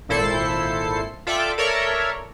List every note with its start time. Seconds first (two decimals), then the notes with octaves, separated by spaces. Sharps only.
0.09 G#1 A#2 E4 A4 C5 C7
1.27 F4 A4 D5 E5 G5 D6
1.58 A4 A#4 C#5 D5 E5